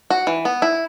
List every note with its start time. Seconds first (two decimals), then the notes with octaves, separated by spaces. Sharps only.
0.10 F#4
0.27 E3
0.45 B3
0.62 E4